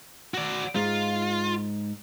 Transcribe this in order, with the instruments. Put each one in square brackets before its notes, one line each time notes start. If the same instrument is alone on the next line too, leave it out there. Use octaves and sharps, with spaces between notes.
[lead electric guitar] F#4 D5
[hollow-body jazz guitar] G#2 [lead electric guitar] F4